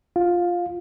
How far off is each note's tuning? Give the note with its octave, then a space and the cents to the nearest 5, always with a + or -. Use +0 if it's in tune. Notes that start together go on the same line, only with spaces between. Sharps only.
F4 +0 F5 +15